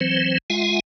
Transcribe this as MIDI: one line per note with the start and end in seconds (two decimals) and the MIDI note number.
0.01 0.38 52
0.01 0.38 54
0.01 0.38 60
0.01 0.38 72
0.50 0.80 56
0.50 0.80 65
0.50 0.80 76
0.50 0.80 78
0.50 0.80 80